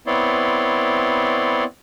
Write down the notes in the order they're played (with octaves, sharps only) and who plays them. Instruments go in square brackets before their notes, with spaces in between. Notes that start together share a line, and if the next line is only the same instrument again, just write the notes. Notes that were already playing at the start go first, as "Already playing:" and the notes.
[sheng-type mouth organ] B3 C4 E4 C#5 D5 C6